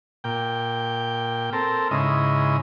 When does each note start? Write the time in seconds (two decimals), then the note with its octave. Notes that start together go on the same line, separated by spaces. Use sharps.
0.24 A#2 G5
1.53 C4 A4 A#4
1.91 G#2 C#3 E4 D#5